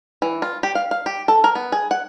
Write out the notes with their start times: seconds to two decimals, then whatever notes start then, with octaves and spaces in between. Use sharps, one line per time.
0.22 E3
0.42 F4
0.63 G4
0.75 F5
0.91 F5
1.06 G4
1.28 A4
1.44 A#4
1.55 B3
1.72 G#4
1.91 F#5